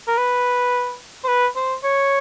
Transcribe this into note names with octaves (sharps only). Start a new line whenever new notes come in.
A#4
B4
C5
B4
C5
C#5